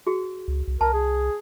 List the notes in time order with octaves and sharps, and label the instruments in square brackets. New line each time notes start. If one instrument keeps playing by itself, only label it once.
[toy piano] F#4 G#4
[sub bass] C#2
C2
[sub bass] C2 [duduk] A#4 [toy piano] A5
[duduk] G#4